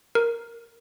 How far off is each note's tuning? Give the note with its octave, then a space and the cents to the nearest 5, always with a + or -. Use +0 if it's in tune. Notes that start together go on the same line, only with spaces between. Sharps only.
A#4 +0